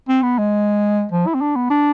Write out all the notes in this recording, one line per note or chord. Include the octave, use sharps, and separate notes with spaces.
C4
B3
G#3
F3
E4
C4
D4
B3
D4